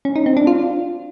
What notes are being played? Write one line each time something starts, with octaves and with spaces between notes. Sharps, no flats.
C#4
D#4
C4
D4
F4